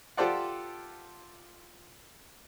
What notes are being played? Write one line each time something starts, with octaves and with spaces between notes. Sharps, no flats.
F4 G4 A4 C5 D5 F#5